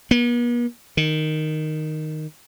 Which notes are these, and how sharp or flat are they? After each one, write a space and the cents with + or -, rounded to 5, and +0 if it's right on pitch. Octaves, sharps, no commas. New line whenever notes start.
B3 -45
D#3 -5